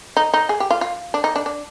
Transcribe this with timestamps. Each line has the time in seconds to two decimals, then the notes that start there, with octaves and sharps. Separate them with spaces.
0.17 D#4
0.34 D#4
0.49 G#4
0.60 G4
0.71 F4
0.81 F4
1.14 D4
1.24 D#4
1.36 D4
1.46 D4